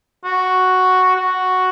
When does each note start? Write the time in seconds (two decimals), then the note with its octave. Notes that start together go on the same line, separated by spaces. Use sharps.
0.25 F#4
1.16 F#4